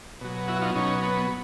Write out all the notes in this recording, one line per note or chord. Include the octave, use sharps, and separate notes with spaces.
B2 F#3
E4 F#4
D#4 F4
B2 F#3 C#4 D#4
B3